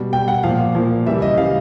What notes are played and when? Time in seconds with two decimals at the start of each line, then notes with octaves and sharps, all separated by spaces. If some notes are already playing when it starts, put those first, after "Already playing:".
Already playing: B2 G3
0.12 B2 G3 G5
0.28 F#5
0.43 A#2 F3 F5
0.75 A#2 F3
1.06 C#3 E3 G3 E5
1.22 D#5
1.38 C#3 E3 G3 F5